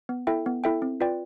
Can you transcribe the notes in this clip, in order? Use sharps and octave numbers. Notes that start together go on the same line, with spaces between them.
B3
E4 A4 E5 G5
B3
E4 A4 E5 G5
C4
F4 B4 D5 G5